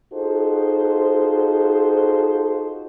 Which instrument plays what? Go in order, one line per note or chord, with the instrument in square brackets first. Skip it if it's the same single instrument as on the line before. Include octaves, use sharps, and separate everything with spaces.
[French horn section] D#4 F4 F#4 G#4 A4 C5